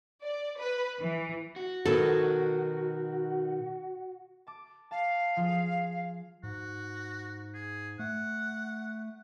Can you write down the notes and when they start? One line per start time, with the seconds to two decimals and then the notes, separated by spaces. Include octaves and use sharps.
0.23 D5
0.60 B4
1.02 E3
1.56 F#4
1.86 B2 D#3 F#3 B3 A4
4.47 A5 D6
4.91 F5 A5
5.37 F3 F4 G#4
6.43 G#2 F#4
7.54 G#4
7.99 A3 F#5